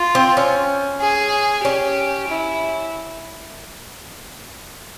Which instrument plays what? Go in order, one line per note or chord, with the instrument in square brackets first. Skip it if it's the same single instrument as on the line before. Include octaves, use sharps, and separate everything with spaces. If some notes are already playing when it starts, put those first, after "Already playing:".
Already playing: [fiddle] F4
[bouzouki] C4
C#4
[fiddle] G#4
[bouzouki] C#4 [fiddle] G4
[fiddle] E4